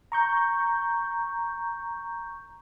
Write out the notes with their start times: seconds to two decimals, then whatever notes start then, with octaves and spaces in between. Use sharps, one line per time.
0.12 A#5 C#6 G6